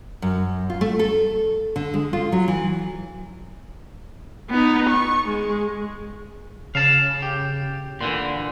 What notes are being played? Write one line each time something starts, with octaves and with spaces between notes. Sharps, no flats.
F#2
F4
A3
A4
D3
G#3
F4
F#3
E3
B3 D#4
C#6
G#3
C#3 F5 A5
G4
A#2 D3 E3 C6